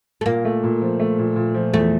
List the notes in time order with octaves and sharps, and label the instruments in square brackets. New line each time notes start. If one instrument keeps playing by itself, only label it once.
[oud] A3
[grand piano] A#2 [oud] A#3
[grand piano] A3
A#2
F3
A3
A#2
A#2
F3
[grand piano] E2 [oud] A3